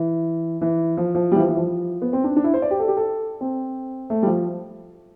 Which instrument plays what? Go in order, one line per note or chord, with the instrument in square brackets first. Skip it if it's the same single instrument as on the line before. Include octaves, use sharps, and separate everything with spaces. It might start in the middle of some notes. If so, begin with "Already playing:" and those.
Already playing: [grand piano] E3
E3
F3
F3
G3
E3
F3
E3
F3
B3
C4
D4
D4
E4
C5
D5
G4
A4
G4
A4
C4
A3
G3
F3